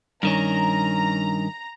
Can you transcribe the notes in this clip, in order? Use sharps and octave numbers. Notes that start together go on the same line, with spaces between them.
G2 D#3 C#4 A#5